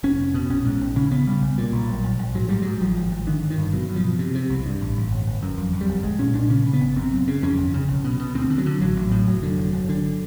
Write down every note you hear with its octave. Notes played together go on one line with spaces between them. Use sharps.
F1 C#4
F1
B2
A#1 C#4
G#2
A#1
C#3 C#4
C#3 B3
C#3 G3
B1
A#2
B1
A#1
A#1
A#1
G#2 F#3
G#2 G3
G#2 F#3
G#1 F3
G#1
G#1
D3 D#3
G1
D#3
G2
B2 F#3
B2
F3
B2
C3
C3
C2
G2
A1
A1
G1
G1
F#2
F2
F2
G3
G1
B1 G#3
A#2 C#4
A#2 D4
C#3 C#4
C#3
B3
G#1
F#2 C4
F#1
C#3
F2 C#4
G1
C#3
B1
B2
B2
D2 C4
D3
F#3
D3
A1 F#3
A1
A2
F1 F#3
D3
F1
G1
D3